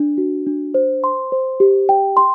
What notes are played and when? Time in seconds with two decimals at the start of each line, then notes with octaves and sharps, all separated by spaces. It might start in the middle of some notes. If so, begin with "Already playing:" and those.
Already playing: D4
0.18 F#4
0.47 D4
0.74 C5
1.04 C6
1.32 C5
1.60 G4
1.89 G5
2.17 C6